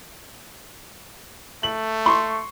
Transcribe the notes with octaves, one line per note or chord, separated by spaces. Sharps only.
A3 F#7
C6 C#6